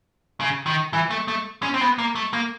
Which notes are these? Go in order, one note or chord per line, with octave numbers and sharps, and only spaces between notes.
C#3
D#3
E3
A3
A3
C#4
C4
B3
A#3
A3
A#3